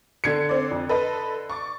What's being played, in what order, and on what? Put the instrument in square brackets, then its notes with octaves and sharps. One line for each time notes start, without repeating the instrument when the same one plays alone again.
[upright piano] D3 G#6 C#7
[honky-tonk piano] C4 D5
F2
A4 B4 D#5
C#6 D6 A6